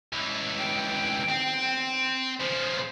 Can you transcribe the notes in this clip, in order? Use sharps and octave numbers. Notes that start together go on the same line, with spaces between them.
C#2 E3
G5
C4
C#3 F3 C5